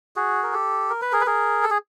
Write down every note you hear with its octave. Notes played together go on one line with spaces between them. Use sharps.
F#4 G#4
A#4
G4 A4
A#4
B4
G#4 A#4
B4
G#4 A#4
A4
G#4